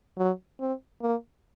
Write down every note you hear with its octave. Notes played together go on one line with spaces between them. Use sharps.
F#3
C4
A#3